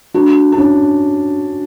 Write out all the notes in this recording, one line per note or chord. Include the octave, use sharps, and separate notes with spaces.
D4 F#4
D4
C#4 E4